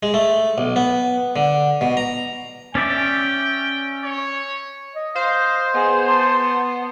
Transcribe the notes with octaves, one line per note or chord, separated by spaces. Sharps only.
G#3
A3
B1
B3
D3
B2
A#5
C#4 D5 E5 G5
C#5
D#5
C5 F5
B3 G#4
A5 C6